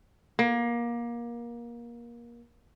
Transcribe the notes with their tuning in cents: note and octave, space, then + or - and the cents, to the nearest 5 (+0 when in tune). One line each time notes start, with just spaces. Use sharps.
A#3 +25